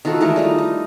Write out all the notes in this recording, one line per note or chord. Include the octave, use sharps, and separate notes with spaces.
D#3 F4 F#4 A4
E3 G#3 A3 A#4
G3 D#4 F4
D#4